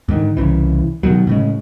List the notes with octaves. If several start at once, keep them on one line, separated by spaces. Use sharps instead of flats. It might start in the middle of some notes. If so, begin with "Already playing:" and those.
G#2 D3 D#3
C2 C#3 E3
B2 D#3 F#3
A2 C#3 G#3